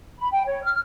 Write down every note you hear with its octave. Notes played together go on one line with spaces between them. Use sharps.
B5
G5
C#5
F6